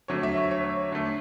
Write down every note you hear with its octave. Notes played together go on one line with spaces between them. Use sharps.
D3 F#3 A3 C#5
E5
C#5
C#5
D3 A3